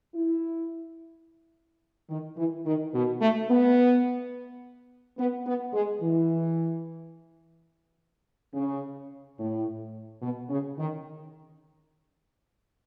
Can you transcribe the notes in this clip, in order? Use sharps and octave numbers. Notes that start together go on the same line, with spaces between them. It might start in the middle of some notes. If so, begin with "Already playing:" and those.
E4
D#3
E3
D#3
B2
A3
B3
B3
B3
G#3
E3
C#3
A2
B2
C#3
D#3